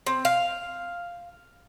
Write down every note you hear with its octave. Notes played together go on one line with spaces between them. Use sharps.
C4
F5